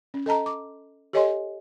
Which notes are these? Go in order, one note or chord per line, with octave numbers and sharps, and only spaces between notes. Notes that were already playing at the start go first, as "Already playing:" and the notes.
C#4
A4 D#5 A5 A#5
D6
G4 A4 C#5 D#5 G#5 C6